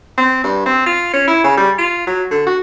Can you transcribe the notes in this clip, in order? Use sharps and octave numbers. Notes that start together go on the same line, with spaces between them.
C4
G2
C4
F4
C#4
E4
C#3
G3
F4
F#3
D3
F#4